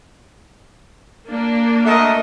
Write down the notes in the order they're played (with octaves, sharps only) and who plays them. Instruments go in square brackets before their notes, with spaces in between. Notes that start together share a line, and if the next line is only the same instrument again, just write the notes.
[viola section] A#3 D4
[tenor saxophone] A3 [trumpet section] F#4 A#4 D#5